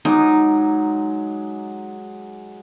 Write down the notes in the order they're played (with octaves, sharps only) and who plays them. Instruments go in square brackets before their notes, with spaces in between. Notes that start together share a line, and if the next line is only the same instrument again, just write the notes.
[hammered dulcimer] F#3 G#3 D6 [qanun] D#4